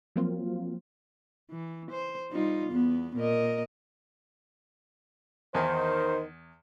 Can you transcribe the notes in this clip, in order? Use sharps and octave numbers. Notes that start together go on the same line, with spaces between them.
F3 F#3 A#3 C4 F4
E3
C5
G3 D#4 F4
E2 B3
A#2 A#4 D#5
E2 D#3 C5 G#5